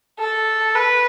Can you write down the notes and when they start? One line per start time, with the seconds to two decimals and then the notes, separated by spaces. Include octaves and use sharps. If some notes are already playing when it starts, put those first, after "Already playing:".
0.20 A4
0.75 B4